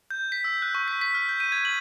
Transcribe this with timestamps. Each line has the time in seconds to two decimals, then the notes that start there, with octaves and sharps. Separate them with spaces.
0.11 G6
0.32 B6
0.44 E6
0.62 F#6
0.75 C#6
0.88 B6
1.01 B6
1.15 F6
1.29 G6
1.40 D#7
1.52 G#6
1.65 F#7